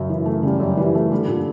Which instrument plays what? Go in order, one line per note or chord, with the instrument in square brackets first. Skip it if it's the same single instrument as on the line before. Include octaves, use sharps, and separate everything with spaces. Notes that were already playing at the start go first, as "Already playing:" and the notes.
Already playing: [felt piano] F#2 C#3
E3
A3
[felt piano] C#3 [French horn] G3
[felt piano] F#2
E3
A3
[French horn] D3 [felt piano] G3
[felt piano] A#2